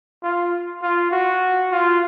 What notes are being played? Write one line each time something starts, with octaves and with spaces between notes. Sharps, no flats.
F4
F4
F#4
F4